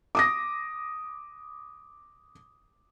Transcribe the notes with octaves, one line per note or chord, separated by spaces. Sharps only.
D6 D#6 A#6